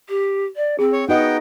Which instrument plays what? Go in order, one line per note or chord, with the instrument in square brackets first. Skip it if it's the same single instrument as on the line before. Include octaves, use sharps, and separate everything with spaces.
[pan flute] G4
D5
[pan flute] C4 [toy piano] G#4
[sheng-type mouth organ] C#5
[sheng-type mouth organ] B3 G5 [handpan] D#4 F#4 D#5 [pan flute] F#5